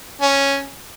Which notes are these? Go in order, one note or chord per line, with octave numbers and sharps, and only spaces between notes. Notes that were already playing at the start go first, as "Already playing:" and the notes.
C#4